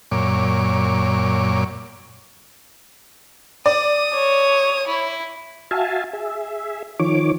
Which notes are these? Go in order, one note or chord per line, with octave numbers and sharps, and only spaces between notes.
F#2 A#2 C#5 D6
D5 D#6
C#5
E4
F#4 E5 F5 G#5 A5
G#4 E5
D#3 F3 C#5 D6